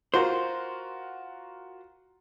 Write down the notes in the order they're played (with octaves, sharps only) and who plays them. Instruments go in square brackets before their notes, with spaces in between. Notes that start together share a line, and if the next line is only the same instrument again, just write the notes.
[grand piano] F4 F#4 A#4 [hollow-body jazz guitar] C5